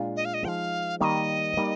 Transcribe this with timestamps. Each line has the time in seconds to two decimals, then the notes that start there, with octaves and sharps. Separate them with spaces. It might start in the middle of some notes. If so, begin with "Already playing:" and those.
Already playing: A#2 G#3 D4 F4
0.16 D#5
0.25 F5
0.34 D#5
0.44 F3 G#3 D#4 F5 G5
1.00 D#3 G3 A#3 D#5 F5
1.57 G3 A#3 D#4